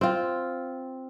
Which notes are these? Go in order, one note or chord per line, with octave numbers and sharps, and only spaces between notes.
C4 F4